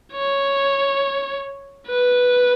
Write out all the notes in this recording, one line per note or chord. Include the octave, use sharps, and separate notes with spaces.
C#5
B4